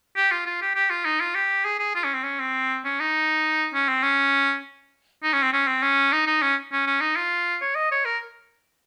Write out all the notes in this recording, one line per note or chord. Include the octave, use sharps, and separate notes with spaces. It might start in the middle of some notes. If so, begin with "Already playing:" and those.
G4
F4
F4
G4
G4
F4
D#4
F4
G4
G#4
G#4
F4
C#4
C4
C#4
C4
C#4
D#4
C#4
C4
C#4
D#4
C#4
C4
C#4
C4
C#4
D#4
D#4
C#4
C#4
C#4
D#4
F4
C#5
D#5
C#5
A#4